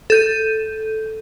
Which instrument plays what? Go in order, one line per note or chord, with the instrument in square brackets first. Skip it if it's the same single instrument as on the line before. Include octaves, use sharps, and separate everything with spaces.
[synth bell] A4 G6 D#7